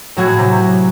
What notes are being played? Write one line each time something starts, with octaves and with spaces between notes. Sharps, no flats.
A2 F#3 F#4 G#4
C3